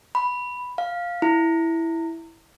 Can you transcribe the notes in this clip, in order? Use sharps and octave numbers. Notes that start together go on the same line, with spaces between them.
B5
F5
E4